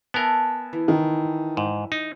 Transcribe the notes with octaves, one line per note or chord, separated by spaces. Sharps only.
B3 A#4 E5 G#5 A5
E3 B4
D#3
G#2
D#4